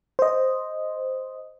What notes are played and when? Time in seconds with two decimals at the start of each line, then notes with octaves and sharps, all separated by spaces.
0.19 C5 D#5